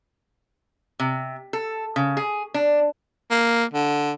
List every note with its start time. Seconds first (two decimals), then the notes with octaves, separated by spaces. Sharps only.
1.00 C3
1.53 A4
1.96 C#3
2.17 G#4
2.54 D4
3.31 A#3
3.74 D3